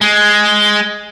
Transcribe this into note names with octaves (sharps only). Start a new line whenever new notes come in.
G#3